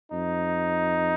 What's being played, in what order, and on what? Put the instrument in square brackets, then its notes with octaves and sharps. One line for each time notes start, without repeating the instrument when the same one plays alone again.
[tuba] F2 [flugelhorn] D#4